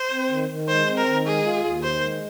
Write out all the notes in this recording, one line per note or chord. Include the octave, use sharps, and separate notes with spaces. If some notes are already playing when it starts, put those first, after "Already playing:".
Already playing: C5
C4
D#3
D#3
G#3 C5
C4
A#4
D#3
G#3 G#4
F4
D#2
D#3 C5
G#3